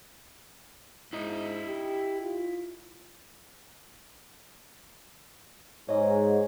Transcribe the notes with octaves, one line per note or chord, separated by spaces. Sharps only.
G#2 E4 D#5
G4
F4
G#2 C#5 D#5